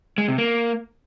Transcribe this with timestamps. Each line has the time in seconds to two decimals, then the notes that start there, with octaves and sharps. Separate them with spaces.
0.18 G#3
0.28 C3
0.38 A#3